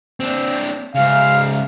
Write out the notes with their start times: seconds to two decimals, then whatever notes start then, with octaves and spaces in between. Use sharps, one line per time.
0.20 C4 D4
0.95 G#2 C#3 F5